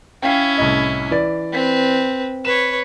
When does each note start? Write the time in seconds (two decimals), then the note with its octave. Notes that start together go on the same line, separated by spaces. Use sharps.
0.22 C#4 E4 F5 G5
0.58 C2 A2 D#5
1.11 E3 D5
1.52 C4 B4
2.45 B4 C#5 E7